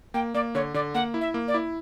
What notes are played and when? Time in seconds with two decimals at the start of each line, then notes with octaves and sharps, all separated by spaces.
0.14 A#3 G5
0.34 A#3 D5
0.54 D3 C#5
0.74 D3 D5
0.94 A#3 F#5
1.14 E4
1.21 E5
1.34 A#3
1.48 D5
1.54 E4